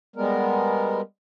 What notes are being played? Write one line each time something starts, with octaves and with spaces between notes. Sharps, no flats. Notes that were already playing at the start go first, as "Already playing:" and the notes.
G3 G#3 B3 A#4